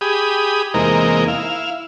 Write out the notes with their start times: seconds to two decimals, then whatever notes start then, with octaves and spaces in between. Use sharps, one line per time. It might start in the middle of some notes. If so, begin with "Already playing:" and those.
0.01 G4 G#4 B5 D#6
0.74 E2 C3 G#3 A#3 D#4 A#4
1.28 E4 F5